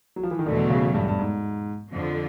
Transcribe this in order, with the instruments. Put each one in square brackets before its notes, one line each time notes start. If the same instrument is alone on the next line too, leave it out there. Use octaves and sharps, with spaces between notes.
[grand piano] F#3
F3
E3
D#3
[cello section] E2 B2 F#3 A3 [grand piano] D3
[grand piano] C#3
G2
G2
G#2
[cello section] F2 D3 F3